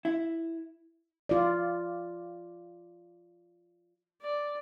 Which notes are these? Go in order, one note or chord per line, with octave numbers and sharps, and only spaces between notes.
E4
F4 D5
D5